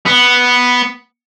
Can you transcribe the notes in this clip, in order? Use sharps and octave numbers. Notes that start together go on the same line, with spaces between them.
B3